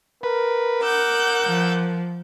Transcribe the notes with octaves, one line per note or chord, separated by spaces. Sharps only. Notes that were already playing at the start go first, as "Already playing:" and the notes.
A#4 B4
F#5 D6 E6 G6
F3